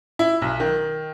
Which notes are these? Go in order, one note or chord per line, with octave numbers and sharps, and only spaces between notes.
E4
B1
D#3